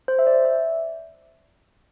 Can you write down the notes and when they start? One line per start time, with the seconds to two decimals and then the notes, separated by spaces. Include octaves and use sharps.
0.08 C5
0.19 E5
0.27 D5
0.45 E5